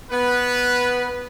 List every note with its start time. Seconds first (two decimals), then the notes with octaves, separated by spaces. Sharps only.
0.11 B3 B4